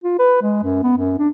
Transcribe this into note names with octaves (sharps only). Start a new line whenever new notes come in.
F4
B4
G#3
F#2
B3
F#2
D4